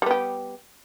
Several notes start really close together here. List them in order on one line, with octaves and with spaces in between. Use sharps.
G3 B3 G4